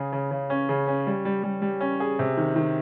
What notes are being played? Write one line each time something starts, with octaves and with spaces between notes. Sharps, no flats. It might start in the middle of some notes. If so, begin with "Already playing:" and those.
Already playing: C#3 G#4
C#3
C#3
C#4
C#3
C#4
G3
G3
G3
G3
C#4
G#4
C3
D#3
D#3